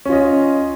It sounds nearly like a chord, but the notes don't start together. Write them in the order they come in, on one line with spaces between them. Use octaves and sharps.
C#4 F4 D#5